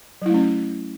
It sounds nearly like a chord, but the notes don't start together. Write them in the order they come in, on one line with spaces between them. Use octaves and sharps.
F#3 E4 A3 C#4